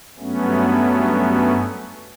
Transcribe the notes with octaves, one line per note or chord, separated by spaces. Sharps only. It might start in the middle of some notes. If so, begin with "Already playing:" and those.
G2 F#3 A3 B3 C#4